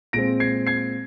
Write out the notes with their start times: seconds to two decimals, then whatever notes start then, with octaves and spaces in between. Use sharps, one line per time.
0.13 A#2 G#3 C4 A#6 D7
0.40 G#6 C7
0.67 G#6 C7